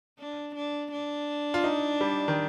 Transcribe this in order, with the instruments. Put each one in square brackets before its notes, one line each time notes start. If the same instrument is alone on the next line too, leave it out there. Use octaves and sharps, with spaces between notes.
[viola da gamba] D4
D4
D4
[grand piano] F4
D#4
G3
D#3